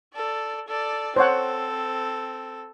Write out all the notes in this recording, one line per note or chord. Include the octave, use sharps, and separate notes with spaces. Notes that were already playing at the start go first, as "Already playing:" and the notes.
A4 D5
A4 D5
C4 A4 C5 C#5 F#5